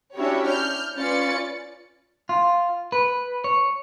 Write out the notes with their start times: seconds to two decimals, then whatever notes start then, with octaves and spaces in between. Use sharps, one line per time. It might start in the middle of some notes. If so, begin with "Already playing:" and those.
0.15 C#4 D4 E4 F#4 G4 C#5
0.48 F6 G6
0.96 C#4 F4 B4 D5 A6 C#7
2.29 F4
2.92 B4
3.44 C#5